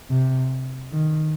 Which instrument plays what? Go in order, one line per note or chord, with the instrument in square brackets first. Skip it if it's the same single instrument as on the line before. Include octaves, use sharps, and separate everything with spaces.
[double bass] C3
D#3